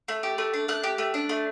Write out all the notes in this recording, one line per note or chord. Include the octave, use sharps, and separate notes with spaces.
A3
G4
A3
D4
A3 F#6
G4
A3
D4
A3